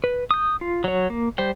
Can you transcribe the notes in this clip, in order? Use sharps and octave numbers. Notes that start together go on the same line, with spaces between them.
B4
D#6 G6
F4
F#3 C#5
A#3
G3 C5 G5